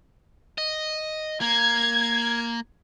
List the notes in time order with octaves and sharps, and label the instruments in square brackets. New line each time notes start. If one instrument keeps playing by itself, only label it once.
[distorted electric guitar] D#5
[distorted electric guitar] A#3 [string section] G#6